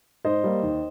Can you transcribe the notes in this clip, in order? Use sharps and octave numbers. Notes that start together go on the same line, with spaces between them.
G#2 C5 D#5
G3 A#3
D#2